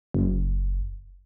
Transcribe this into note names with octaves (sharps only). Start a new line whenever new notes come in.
F#1